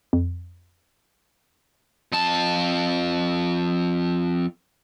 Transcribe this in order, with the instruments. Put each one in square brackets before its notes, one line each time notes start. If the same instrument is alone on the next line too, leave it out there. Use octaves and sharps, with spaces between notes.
[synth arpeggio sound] F2
[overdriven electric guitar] F2 A5